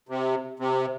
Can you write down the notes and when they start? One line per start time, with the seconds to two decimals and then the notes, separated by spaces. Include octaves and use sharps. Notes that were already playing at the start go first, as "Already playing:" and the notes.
0.09 C3
0.59 C3